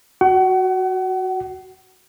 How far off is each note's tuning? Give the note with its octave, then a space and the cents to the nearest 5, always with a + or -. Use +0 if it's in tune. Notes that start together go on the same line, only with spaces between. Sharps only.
F#4 +0 F#5 +35